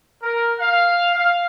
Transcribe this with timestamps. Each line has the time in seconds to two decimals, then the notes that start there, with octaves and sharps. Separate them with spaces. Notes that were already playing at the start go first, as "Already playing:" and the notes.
0.22 A#4
0.59 F5
1.16 F5